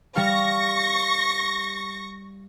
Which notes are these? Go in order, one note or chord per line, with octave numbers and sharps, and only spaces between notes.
G3 G4 F5 C#6 A#6